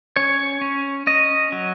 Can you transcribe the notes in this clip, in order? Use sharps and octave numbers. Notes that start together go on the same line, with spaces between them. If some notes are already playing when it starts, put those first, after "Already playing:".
C#4 C#5
C#4
C#4 D#5
F#3